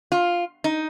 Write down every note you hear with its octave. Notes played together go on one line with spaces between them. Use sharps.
F4
D#4